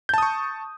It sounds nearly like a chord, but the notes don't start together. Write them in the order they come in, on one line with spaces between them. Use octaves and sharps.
G6 A5 D#6 C#6